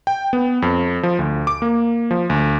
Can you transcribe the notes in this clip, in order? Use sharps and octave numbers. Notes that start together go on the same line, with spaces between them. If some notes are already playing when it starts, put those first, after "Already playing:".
G5
B3
F2
F3
D2
D6
A#3
F3
D2